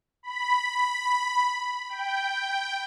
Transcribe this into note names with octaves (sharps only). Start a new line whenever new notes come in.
B5
G5